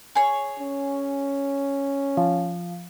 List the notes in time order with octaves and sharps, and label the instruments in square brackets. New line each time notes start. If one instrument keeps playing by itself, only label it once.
[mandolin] G#4 C#5
[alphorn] C#4
[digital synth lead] F3